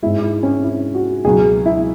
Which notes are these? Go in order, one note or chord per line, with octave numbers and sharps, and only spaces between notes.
G#2 G#3 E4
E4
C#4
E4
F#4
C#2 B2 F#3 G#4
E4